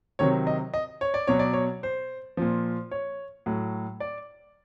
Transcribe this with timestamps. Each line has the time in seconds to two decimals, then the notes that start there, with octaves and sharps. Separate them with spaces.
0.19 C3 D#3 F#3 C#5
0.47 D#5
0.74 D#5
1.01 C#5
1.14 D5
1.27 B2 F#3 C#5
1.39 D5
1.53 C#5
1.83 C5
2.37 A#2 F3
2.91 C#5
3.46 A2 F#3
4.00 D5